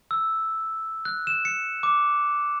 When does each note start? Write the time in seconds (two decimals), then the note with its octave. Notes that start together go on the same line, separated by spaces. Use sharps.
0.11 E6
1.05 F#6
1.27 E7
1.45 C#7
1.83 D6